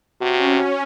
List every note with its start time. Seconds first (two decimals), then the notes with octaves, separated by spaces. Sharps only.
0.21 C3 C#4 F#4